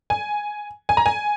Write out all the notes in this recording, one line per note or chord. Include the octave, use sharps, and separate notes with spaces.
G#5
G#5
A#5
G#5